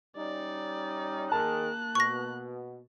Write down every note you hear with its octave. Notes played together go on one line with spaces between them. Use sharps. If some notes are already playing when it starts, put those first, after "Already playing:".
G3 C#4 D#4 D5
D#3 A#3 G#4 A#4 A5 F#6
B2 C#6 A#6